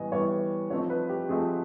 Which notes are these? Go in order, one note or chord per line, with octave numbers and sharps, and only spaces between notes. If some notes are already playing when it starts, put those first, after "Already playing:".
Already playing: A2 E3 G3 B3 D#5 G#5
A2 E3 G3 B3 C#5
F3 A3 C4 D#4 C#5
B4
G4
F3 A3 C4 D#4 G#4